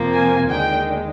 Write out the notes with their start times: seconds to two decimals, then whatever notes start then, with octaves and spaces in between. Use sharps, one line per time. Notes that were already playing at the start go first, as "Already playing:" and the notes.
Already playing: F2 C3 F3 A#3
0.13 G#5
0.48 D#2 D3 G#3 G5